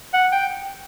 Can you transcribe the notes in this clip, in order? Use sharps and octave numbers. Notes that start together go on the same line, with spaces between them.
F#5
G5